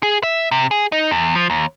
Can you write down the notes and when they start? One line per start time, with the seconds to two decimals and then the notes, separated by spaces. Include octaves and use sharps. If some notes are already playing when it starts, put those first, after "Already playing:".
0.03 G#4
0.23 E5
0.51 C3
0.71 G#4
0.92 D#4
1.11 E2
1.35 F3
1.50 D#2